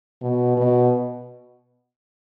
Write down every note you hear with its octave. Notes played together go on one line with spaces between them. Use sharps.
B2
B2